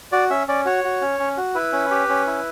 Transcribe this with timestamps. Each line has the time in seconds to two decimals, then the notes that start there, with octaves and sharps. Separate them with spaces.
0.12 F#4 D5
0.30 C#4 E5
0.48 C#4 D5
0.65 F#4 C#5
0.84 F#4
1.01 C#4
1.19 C#4
1.37 F#4
1.55 E4 B4
1.73 C#4
1.91 G4
2.09 C#4
2.27 E4